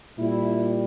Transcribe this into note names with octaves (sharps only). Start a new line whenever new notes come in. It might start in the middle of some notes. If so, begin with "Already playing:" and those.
A#2 G3 E4